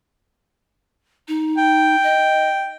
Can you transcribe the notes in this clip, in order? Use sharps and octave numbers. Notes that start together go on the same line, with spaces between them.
D#4
G5
D#5